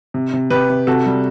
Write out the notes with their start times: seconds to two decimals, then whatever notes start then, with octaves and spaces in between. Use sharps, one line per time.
0.14 C3
0.33 C3
0.50 C3 G4 B4
0.70 C3
0.87 C3 F#4 A4
1.06 G3